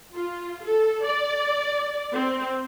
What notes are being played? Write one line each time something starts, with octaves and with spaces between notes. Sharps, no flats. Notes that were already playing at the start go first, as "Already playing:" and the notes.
F4
A4
D5
C4